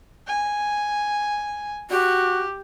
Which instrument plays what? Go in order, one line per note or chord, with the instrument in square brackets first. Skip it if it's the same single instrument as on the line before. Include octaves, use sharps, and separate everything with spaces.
[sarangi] G#5
[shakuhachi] F#4 [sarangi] G4